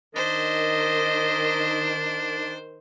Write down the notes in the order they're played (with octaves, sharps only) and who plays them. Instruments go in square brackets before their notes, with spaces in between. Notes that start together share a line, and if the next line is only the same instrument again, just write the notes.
[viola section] D#3 [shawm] D4 [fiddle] C5 [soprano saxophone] D#5